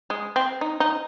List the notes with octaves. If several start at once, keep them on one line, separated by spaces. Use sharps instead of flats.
G#3
C4
D#4
D#4